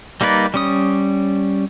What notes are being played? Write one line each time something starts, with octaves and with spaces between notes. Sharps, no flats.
G3 A#3 D#4 B4 D5
G3 C#4 D#6